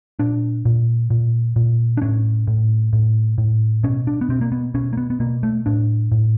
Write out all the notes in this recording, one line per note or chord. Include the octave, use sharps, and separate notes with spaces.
A#2 D4
A#2
A#2
A#2
D4
A2 C#4
A2
A2
A2
B2 C#4
D4
B3
B2 C4
A#3
B3
B2 C#4
A#3
B3
B3
B2 A#3
A3
A2 D4
A2